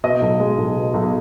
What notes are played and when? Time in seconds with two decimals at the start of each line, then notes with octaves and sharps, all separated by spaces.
0.04 B2 D#5
0.22 B1
0.40 G#3
0.58 B1
0.76 B2
0.94 B1